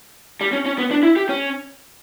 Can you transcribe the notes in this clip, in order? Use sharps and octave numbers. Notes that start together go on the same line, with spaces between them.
G3
C#4
C#4
B3
D4
E4
G4
C#4